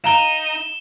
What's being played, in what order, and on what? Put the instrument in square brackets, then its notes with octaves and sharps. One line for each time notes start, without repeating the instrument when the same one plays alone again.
[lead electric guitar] D#4 [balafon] F5 A#5 [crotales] E7 G7